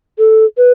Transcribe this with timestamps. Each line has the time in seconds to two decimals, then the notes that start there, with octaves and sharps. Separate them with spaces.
0.18 A4
0.57 B4